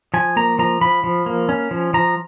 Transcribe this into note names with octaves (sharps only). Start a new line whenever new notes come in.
F3 G#5
A#3 A#5
F3 A#5
F3 B5
F3
A#3
C#4
F3
F3 A#5